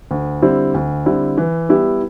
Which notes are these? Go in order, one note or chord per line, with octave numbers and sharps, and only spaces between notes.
D2
D3 G3 C4 E4
D2
D3 G3 C4 E4
E3
G3 B3 E4 G4